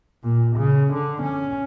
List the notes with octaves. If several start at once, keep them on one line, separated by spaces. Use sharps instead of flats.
A#2
C#3
D3
C#4